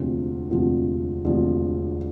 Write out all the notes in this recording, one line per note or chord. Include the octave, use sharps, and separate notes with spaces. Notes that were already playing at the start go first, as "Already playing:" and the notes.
Already playing: E1 D2 C3 F3
E1 D2 C3 F3
E1 D2 C3 F3